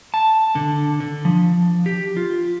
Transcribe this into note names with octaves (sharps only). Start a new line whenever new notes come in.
A5
D3
D3
F3
G4
F4